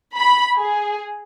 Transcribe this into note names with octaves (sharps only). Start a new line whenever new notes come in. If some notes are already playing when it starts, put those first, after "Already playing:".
B5
G#4